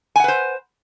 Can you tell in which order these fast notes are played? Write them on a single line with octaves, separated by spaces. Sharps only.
G#5 F#5 B4 C5